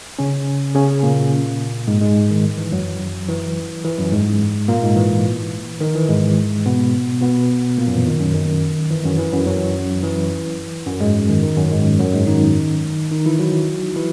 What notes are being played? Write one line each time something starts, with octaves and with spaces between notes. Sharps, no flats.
C#3 C#4
C#3 C#4
A#2 A#3
G#2 G#3
G#2 G#3
D#3
E3
F#2 F#3
E3
E3
F#2 F#3
G#2 G#3
A#2 A#3
G#2 G#3
E3
D#3
E3
G#2 G#3
B2 B3
B2 B3
A#2 A#3
F#2 F#3
E3
D#3
F#2 F#3
D#3
E3
F#2 F#3
E3
F#2 F#3
F#2 F#3
E3
F#2 F#3
G#2 G#3
D#3
D#3
F#2 F#3
G#2 G#3
F#2 F#3
G#2 G#3
D#3 D#4
D#3 D#4
E3 E4
F#3 F#4
E3 E4